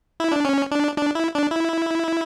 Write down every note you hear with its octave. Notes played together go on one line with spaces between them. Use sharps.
E4
D4
C#4
D4
D4
E4
D4
E4